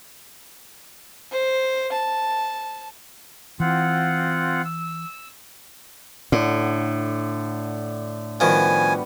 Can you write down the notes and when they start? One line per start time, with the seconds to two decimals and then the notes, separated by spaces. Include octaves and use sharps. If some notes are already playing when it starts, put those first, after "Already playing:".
1.31 C5
1.92 A5
3.60 E3 C4 F4 F#5
4.64 E6
6.32 A2 D3 F#5
8.40 D#3 F3 G3 B3 F#4 G#5